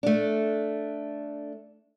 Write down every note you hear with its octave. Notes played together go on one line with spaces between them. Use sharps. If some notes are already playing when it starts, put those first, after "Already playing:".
A3 D4